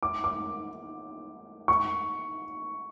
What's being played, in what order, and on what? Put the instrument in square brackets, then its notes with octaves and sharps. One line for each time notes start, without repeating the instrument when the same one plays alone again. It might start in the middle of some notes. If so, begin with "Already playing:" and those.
[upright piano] D6
D6
C#6